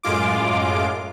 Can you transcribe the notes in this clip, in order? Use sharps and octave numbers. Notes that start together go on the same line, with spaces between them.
F#2 A2 G#3 F4 D6